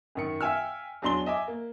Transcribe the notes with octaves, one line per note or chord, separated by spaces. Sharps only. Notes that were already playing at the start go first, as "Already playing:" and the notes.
F#2 D#3 C#7
E5 F5 G5 G#5 E6 F6
E2 F#3 D4 C6 G7
D#5 E5 G#5 D6
A#3